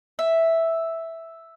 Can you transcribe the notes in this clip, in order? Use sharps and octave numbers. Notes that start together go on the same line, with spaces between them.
E5